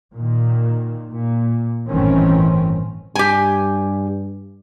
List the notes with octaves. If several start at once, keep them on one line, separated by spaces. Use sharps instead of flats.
A#2 D#3
A#2
G1 A2 D#3 E3 C4 C#4
G2 G4 G#5